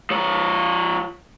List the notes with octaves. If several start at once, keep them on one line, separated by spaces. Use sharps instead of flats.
F3 C#5